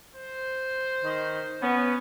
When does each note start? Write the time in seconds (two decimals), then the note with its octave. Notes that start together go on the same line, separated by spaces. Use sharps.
0.16 C5
1.03 D#3
1.62 B3 C#4